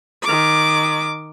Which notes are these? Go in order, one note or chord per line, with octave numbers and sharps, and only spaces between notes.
D#3 D6